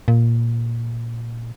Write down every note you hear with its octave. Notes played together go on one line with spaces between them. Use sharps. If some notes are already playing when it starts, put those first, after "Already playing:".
A#2